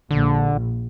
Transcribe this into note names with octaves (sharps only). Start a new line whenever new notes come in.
A#1 D3